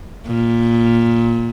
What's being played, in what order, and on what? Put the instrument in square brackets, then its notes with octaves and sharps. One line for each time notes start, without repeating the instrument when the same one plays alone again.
[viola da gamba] A#2